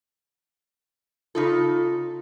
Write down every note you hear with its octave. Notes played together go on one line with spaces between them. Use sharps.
C#3 D#4 F4 A4